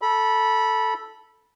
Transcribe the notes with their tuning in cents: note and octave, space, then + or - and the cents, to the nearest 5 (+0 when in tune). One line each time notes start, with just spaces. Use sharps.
A4 +0 B5 -20